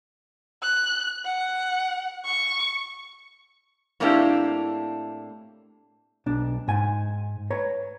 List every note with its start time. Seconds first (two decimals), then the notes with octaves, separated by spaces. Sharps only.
0.63 F#6
1.25 F#5
2.25 C#6
4.00 A2 A#3 C4 D4 E4 G4
6.26 B1 D4
6.68 G#2 G#5
7.50 B4 C#5 A#5